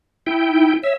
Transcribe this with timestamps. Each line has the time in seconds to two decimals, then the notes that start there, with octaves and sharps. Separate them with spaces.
0.27 E4 G5
0.49 D#4
0.84 C#5 E5